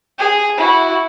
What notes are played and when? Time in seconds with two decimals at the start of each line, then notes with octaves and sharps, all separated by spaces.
0.19 G#4
0.58 E4 F#4